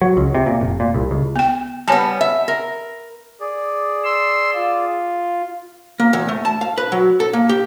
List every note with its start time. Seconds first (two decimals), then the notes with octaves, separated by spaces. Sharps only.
0.01 F#3
0.17 C#2
0.35 C3
0.46 A#2
0.61 F1
0.80 A#2
0.94 C2
1.11 C#2
1.36 B3 G5
1.88 G3 B3 C#5 G#5 A5
2.21 E5
2.48 A#4
3.41 G#4 D5
4.04 C6 E6
4.55 F4
6.00 A#3
6.13 E2
6.29 A3
6.45 A5
6.61 F5
6.78 B4
6.92 F#3
7.20 A4
7.33 A#3
7.49 G4